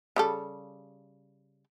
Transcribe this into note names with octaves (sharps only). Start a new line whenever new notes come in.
C#3 G3 A4